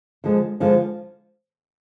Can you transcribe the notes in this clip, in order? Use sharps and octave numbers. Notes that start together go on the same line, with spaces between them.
D3 F3 G#3
D3 F3 G#3